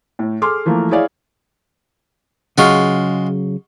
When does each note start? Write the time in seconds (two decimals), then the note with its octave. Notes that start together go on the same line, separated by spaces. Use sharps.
0.19 A2
0.42 G#4 A4 C6 D6 F6
0.66 E3 F3 A3 A#3
0.91 E4 G#4 C#5 D5 F5
2.58 C#3 F#3 G#3 F4 F#4